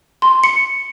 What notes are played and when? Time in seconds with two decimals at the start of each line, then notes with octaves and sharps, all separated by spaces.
0.22 C6
0.44 C#7